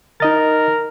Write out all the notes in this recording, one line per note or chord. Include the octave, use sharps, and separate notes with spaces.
D#4 A#4 D#5 A6